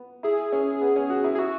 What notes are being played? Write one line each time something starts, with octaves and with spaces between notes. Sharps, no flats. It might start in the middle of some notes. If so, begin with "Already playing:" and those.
Already playing: B3
E4 G#4
C#4
B3
C#4
F#4
E4
G#4
E4 F#4